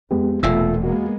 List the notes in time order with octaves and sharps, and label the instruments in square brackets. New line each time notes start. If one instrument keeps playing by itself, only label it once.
[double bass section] F2 [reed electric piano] G#3 B3 G4
[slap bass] E1 A#2 [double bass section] A3 B3 [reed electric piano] F4 E5 E6
[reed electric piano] E2 F#4 [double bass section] G#3 A#3 B3